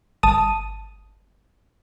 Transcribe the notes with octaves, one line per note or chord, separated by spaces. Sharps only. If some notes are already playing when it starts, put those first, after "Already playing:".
G1 A5 D#6 D#7